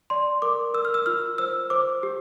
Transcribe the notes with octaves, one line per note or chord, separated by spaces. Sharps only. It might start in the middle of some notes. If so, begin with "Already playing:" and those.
D5 C6
A#4 D6
A#4 E6
F6
E6
F4 F6
C5 E6
C5 D6
G4